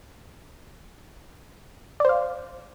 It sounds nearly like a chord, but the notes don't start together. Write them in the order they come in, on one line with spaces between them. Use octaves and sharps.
D5 C5 F5